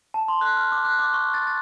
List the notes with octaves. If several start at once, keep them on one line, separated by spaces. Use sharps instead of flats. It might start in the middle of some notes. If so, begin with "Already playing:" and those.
A5
C6
F#6
F6
D6
F#6
D6
C#6
A6
A6